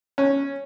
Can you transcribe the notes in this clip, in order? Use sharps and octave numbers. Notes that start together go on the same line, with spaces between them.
C#4